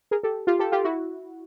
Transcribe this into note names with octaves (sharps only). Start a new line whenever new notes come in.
G#4 A#4
G4 A4
F4 G4
G4 A4
F4 G4
E4 F#4